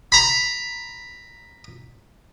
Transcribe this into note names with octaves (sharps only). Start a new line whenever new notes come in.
A#5 B5